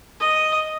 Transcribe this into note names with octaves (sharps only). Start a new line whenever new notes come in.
D#5